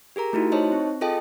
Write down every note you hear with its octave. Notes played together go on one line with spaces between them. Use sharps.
G4 G#4 A#4 A#5
A3 D#4 E4 F#4
D#4 C5 C#5 D#5 A5
C4
F4 G#4 A4 D#5 G5 A5